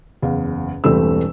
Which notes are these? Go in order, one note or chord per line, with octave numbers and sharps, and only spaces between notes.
F#1 E2 F5
E1 G2 E3 A3 C4 E6